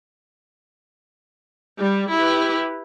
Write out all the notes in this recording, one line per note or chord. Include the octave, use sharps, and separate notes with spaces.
G3
E4 G4 B4